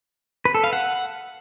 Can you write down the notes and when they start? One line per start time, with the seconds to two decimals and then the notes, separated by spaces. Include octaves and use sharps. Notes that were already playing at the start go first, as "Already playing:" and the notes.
0.45 B4
0.55 A4
0.64 F5
0.73 F#5